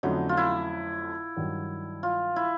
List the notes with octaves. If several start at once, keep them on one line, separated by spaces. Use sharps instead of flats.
F2 D3 F#3 A3 C#4 D#4
F4
E4
G2 D#3 F#3
F4
E4